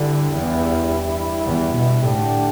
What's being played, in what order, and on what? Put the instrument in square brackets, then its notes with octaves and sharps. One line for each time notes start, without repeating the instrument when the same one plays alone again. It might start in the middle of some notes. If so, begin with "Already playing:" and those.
Already playing: [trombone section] G2 G3 E4 G4 [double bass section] D3
[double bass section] E2
E2
B2
[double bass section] A2 [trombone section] D3 A3 D4 G4